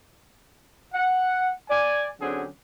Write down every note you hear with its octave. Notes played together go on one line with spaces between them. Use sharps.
F#5
D5 G#5
D3 F#3 C4 C#4 G4 G#4